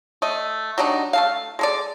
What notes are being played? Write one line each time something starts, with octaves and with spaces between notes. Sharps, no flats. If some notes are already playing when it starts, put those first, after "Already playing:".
A3 D#5
F#3 G3 D4 D#4
A3 A4 F5
G#3 A4 D5